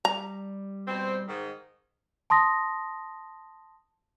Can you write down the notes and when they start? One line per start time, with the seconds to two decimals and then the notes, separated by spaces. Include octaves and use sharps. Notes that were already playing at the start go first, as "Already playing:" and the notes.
0.05 G3 A#5
0.87 B2 C4
1.28 G#2 D#3
2.30 A5 C6 D#6 A#6